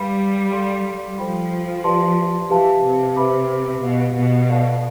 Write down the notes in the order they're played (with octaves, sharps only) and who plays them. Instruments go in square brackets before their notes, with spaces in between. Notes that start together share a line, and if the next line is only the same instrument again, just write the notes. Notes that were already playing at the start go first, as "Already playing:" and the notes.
Already playing: [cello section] G3 [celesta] B4 F5 B5
[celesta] A4 D5 F5 C6
[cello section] F3 [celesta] A4 C5 G5 B5
[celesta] G4 B4 D5 A5 C6
[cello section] E3 [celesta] G4 B4 F5 A5
[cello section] C3
[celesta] G4 B4 E5 B5 D6
[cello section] B2 [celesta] G4 B4 F5
[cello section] B2
[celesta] A4 D5 F5 A5